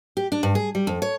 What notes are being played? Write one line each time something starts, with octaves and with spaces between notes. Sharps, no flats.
G4
D4
G2
G#4
G3
F2
C#5